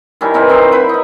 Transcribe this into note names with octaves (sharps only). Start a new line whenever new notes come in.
D#3 G3 C#4 E4
E3 C4 C#4 A#4
F#3 C4 D#4 C5
E4 B4 B5
D#4 E4